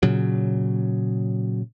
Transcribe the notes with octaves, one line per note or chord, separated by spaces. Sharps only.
A#2 C#3 F#3